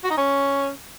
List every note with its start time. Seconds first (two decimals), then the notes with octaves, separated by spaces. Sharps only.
0.04 F#4
0.11 D#4
0.17 C#4